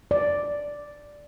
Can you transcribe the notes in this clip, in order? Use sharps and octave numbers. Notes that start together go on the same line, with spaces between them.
D5